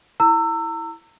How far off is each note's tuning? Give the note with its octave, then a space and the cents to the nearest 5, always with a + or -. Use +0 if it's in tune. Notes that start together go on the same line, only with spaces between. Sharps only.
E4 +0 A#5 -35 E6 +10